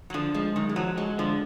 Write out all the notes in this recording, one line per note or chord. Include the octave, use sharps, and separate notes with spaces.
F#3
D3 F3
F3 G#3
F#2 D#3
G#3
F3 F#3
F#3 G#3
D3 F3